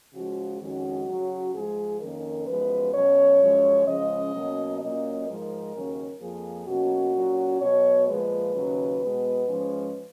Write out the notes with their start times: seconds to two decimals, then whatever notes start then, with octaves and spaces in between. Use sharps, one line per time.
0.13 C#3 F3 G#3 F#4
0.60 F2 D#3 G#3 C#4 F#4
1.07 C#3 F#3 C#4
1.53 G#2 F3 G#3 G#4
2.01 F2 D#3 A#3 C#4 A#4
2.47 F#2 F3 G#3 B3 B4
2.94 B2 F#3 C#4 C#5
3.40 F#2 F3 G#3 C#4
3.87 C#3 F3 G#3 C#4 D#5
4.34 B2 F#3 A#3 C#4
4.80 A#2 F#3 A#3 C#4 D#5
5.27 G#2 F3 G#3 A#4
5.74 D#2 C#3 F#3 C#4
6.21 F2 F3 A#3 G#4
6.68 B2 F#3 A#3 C#4 F#4
7.15 A#2 F#3 C#4
7.61 B2 F#3 B3 C#5
8.08 A#2 F3 G#3 B4
8.55 D#2 C#3 F#3 C#4
9.02 B2 G#3 B3
9.48 G#2 F3 G#3 C#4